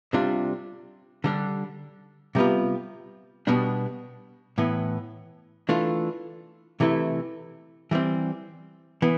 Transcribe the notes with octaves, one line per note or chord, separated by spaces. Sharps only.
C3 G3 D4 F4
D3 G3 D4
C3 G3 B3 F4
B2 G3 B3 D4
A2 E3 B3
E3 A3 D4 F4
C3 E3 A3 E4
E3 G3 C4
E3 B3